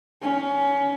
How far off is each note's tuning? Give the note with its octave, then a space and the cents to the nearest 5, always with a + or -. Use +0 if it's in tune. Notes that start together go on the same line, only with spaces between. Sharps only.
C#4 +20